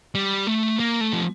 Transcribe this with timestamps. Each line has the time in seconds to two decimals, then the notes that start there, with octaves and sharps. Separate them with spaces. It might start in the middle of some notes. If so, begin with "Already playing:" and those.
0.15 G3
0.47 A3
0.79 A#3
1.01 A3
1.13 F3